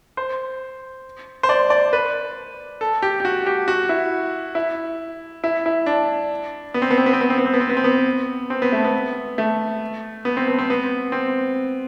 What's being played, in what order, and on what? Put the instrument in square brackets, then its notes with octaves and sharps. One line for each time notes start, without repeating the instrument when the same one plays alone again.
[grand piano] C5
C5
D5
D5
B4
A4
G4
G4
F#4
G4
F#4
E4
E4
E4
E4
D4
B3
C4
B3
C4
B3
C4
B3
C4
B3
C4
B3
C4
B3
C4
B3
C4
B3
A3
B3
A3
B3
C4
B3
C4
B3
C4